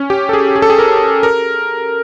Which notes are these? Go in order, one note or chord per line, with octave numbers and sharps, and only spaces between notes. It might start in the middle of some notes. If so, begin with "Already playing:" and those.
Already playing: C#4
G4
A4
G#4
G#4
A4
G#4
A#4
A#4